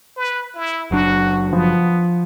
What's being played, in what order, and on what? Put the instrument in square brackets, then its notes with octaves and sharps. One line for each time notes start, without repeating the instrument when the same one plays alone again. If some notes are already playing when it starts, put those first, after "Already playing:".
[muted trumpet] B4
E4
[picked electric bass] F#1 F#3 D4 [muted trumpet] F#4
[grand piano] F3 [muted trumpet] B3